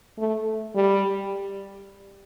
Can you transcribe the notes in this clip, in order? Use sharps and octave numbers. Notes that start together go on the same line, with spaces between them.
A3
G3